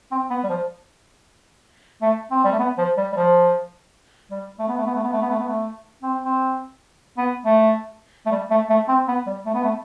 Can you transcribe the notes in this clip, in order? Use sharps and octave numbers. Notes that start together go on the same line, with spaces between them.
C4
B3
G3
F3
A3
C4
G3
A3
B3
F3
G3
G3
F3
G3
A3
B3
A3
B3
A3
B3
A3
B3
A3
B3
A3
C4
C4
B3
A3
A3
G3
A3
A3
C4
B3
G3
A3
B3
A3